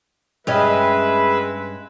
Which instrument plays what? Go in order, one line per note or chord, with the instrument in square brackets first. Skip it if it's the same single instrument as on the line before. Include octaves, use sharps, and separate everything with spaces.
[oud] G2 C#4 D#5 [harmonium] G#3 B4 E5